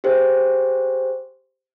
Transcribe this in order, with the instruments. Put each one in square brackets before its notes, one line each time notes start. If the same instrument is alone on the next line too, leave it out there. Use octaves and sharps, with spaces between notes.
[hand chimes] G4 G#4 C5